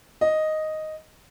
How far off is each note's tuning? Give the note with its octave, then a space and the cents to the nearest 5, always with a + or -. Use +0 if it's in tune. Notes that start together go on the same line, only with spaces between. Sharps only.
D#5 +0